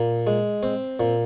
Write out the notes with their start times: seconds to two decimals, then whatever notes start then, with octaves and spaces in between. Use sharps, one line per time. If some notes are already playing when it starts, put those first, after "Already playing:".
Already playing: A#2
0.27 G#3
0.63 C4
1.00 A#2